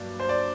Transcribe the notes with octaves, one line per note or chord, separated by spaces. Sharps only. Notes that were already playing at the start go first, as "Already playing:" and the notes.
Already playing: G2 F#3 A#3 D4 D5
C5
D5